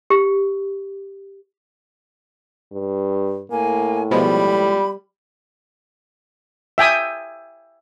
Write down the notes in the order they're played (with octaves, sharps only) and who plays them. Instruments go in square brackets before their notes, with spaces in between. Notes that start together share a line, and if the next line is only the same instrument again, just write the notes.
[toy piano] G4
[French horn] G2
[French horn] A2 [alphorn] A#3 [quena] G#5
[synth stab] B2 F3 G#3 [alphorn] G3 [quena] B5
[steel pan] E5 G5 G#5 D#6